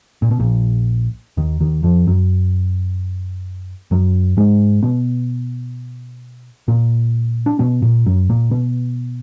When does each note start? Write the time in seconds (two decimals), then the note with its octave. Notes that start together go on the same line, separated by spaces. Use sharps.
0.22 A#2
0.31 B2
0.39 A#1 A#2
1.37 D#2 D#3
1.60 D#2 D#3
1.83 F2 F3
2.07 F#2 F#3
3.91 F#2 F#3
4.37 G#2 G#3
4.83 B2 B3
6.68 A#2 A#3
7.46 D4
7.59 B2 B3
7.82 A#2 A#3
8.06 F#2 F#3
8.29 A#2 A#3
8.51 B2 B3